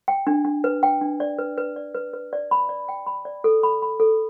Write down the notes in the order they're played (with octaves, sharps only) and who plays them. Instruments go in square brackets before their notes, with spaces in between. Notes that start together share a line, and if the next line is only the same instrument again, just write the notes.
[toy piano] G5
D4
D4
B4
G5
D4
D5
B4
B4
D5
B4
B4
D5
B5
D5
G5
B5
D5
A4
B5
B5
A4